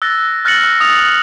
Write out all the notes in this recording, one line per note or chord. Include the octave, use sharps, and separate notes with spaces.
E6 F#6 A6 A#6
F6 F#6 A6 A#6 C#7 F#7
D#6 F7